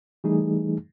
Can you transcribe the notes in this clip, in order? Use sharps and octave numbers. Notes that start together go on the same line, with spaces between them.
E3 G3 A3 D#4 G#4